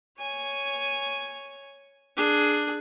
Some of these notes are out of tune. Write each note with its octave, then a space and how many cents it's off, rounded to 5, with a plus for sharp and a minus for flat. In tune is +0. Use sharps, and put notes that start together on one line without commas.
C#5 +0 G#5 +0
D4 +10 G#4 +15